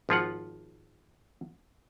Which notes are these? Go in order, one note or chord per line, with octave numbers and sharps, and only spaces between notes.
G#1 F3 F4 F#5